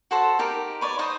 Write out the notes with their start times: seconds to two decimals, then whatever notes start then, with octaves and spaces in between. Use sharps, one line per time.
0.11 F#4 A4 C5 A5
0.39 D#4 G4 A#4
0.81 B4 C#5 D5
0.99 D#4 C5 D#6